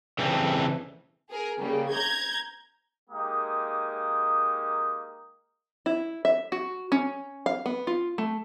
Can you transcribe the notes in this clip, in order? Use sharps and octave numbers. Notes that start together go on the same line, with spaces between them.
C#3 E3 G3 A3 C4
G#4 A#4
C#3 G3 A#3
A#5 G6 G#6
G#3 A#3 D#4 G4 D#6
E4
E5
F#4
C#4
F5
B3
F4
A3